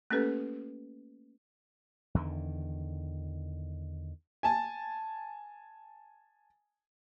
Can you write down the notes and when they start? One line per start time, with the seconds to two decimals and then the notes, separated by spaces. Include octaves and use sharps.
0.10 A3 A#3 C#4 G4 A4 B4
2.15 E2 D3 D#3
4.43 G#5 A5